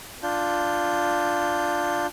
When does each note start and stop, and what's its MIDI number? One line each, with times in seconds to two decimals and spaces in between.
0.23 2.07 62
0.23 2.07 65
0.23 2.07 91